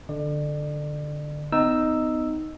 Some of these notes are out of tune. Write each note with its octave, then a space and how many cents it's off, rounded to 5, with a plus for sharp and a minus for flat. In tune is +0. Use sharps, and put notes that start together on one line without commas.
D3 +0 D5 +35
B3 +40 D#4 +0 E6 +0